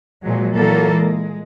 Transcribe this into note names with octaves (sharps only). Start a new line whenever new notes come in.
A#2 F3 F#3 G#3
A#2 E3 F#3 A#3 A4
G#3